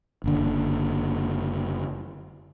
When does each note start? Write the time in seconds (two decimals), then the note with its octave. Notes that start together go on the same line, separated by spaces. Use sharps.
0.24 F#1 D3